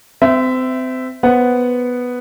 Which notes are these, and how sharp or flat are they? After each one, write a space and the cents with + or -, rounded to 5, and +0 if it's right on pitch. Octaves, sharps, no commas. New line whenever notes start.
C4 -30 E5 +0
B3 +0 C5 +0 F#5 +0